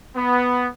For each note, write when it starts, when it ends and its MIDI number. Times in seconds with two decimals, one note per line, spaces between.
0.16 0.67 59